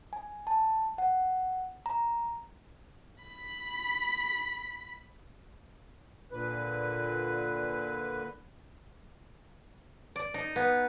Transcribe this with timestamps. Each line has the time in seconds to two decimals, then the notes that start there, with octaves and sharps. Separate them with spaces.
0.13 G#5
0.47 A5
0.98 F#5
1.86 A#5
3.22 B5 B6
6.31 A#2 D3 B4
10.16 D5
10.34 D#4
10.56 B3